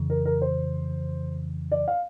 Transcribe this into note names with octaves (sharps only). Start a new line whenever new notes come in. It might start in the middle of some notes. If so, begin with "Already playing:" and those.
Already playing: F2 C#3 E3
A#4
A#4
C5
D5
F5